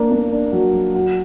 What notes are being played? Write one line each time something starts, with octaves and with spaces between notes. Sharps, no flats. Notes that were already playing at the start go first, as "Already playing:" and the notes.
Already playing: A#3 D4
A#3
D4
F#3
F#3
F#4